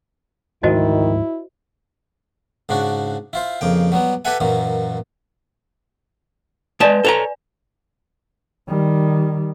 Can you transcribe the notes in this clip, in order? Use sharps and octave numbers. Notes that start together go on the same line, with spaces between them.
D2 G#2 D#3 F3 E4 F#4 C5 D#5
G#2 C#3 D4 F#4
E4 F4 C5
F2 C#3 A#3 G5
F#3 G3 B3
G4 A4 B4 E5 F#5 G#5
F#2 A#2 E3 F#3
G#3 B4 D5 G#5 A5
A4 C#5 A#5
D#3 G3